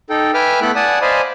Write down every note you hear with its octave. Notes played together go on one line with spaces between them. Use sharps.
D#4 A4 G5
B4 E5 G5 G#5 D6 F6
A3 B3 E4 A4 B5 F#6
D5 F#5 G#5 A5 D#6
C5 D5 D#5 F5 G#5 B5